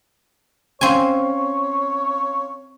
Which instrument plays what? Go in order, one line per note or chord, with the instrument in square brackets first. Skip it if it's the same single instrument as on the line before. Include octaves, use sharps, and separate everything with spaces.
[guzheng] C4 G#5 [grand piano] C#4 F5 C6 [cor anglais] C#5